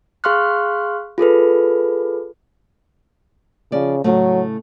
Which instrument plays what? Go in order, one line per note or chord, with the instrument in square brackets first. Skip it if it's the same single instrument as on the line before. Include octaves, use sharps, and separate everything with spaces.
[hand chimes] G#4 F5 C6 C#6 F6 F#6
F4 G#4 A4 B4
[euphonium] C#3 [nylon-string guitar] F3 D5
[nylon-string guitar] A2 C#3 A3 [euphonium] F#3